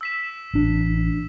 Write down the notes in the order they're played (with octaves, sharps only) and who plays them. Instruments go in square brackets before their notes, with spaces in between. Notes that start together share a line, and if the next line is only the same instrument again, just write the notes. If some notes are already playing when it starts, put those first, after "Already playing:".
[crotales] E6 B6 E7
[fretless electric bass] A1 D4